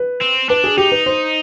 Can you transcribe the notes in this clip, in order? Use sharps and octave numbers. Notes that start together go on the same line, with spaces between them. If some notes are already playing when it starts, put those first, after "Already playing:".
Already playing: B4
C4
D4 B4
G#4
D#4 G4
B4
C5